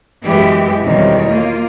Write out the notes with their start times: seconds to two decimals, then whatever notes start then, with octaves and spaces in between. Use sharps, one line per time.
0.23 F#2 E3 G#3 B3 G4 E5
0.81 E2 B2 D#3 G3 C4 C#5
1.26 A#3 F4